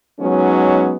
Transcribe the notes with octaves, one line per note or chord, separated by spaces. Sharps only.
F#3 G#3 B3 C#4 D#4